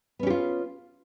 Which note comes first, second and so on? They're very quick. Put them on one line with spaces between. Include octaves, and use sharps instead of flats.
B3 C#4 G4 F4